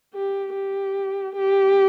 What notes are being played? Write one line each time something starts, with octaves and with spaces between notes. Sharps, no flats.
G4
G4
G4